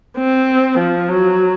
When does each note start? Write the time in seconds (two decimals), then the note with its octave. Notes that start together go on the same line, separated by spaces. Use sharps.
0.17 C4
0.78 F3
1.09 F#3